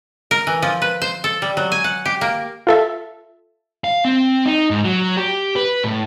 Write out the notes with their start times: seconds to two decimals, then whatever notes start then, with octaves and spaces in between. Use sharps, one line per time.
0.31 A#4
0.47 E3
0.62 F3
0.82 B4
1.02 C5
1.24 A4
1.42 G3
1.57 F#3
1.72 G#5
1.84 F#5
2.05 G4
2.21 A#3
2.67 F4 A4 E5
3.84 F5
4.05 C4
4.46 D#4
4.71 G#2
4.84 F#3
5.17 G4
5.56 B4
5.83 A2